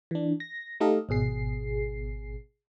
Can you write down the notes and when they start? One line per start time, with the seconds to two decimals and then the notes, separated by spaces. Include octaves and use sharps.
0.11 E3 D4
0.40 A#6
0.80 A3 D#4 G4 A4 D#5 F5
1.09 G#1 B2 G#4 C7